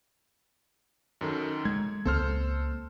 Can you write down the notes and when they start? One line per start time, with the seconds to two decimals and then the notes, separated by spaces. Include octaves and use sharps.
1.21 F#2 D#3 A4
1.65 G#3 G#6
2.05 C#2 A#3 C4 A4 C5 F6